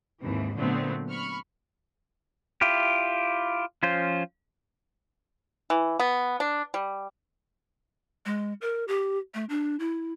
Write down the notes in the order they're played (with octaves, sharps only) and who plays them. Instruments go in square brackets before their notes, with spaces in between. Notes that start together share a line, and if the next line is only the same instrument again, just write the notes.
[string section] D#2 G#2 C3 E3
A#2 D3 F#3 A3 B3 C4
B5 C#6 F6
[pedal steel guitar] E4 F4 G4
F3 C#4 F4 C5
[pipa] E3
B3
D4
G3
[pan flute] G#3
A#4
G4
A3
D4
E4